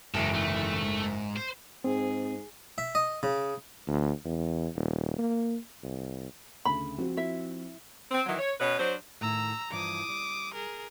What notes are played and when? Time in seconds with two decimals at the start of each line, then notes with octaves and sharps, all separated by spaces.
0.14 F#1 G#2 E3 G#3 A4 D7
0.34 A3
0.83 G#2
1.36 C5
1.84 G#2 C4 G#4
2.78 E5
2.95 D#5
3.23 C#3
3.87 D2
4.25 E2
4.75 D#1
5.18 A#3
5.83 C2
6.65 D2 C#3 B5
6.98 F3 C4 F#4
7.17 E4 E5
8.11 C4
8.26 D#3 E3 F#3
8.39 C#5
8.60 B2 C#4 B4
8.79 F#3 D4 C5
9.21 A2 D#3 E4 A#5 E6
9.72 G2 E3 F3 D6 D#6
10.09 G3
10.55 G#4 A#4